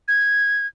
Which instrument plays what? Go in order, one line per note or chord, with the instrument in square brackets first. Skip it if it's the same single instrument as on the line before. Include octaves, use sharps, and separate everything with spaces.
[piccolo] G#6